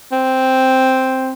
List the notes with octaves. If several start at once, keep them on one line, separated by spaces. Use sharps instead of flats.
C4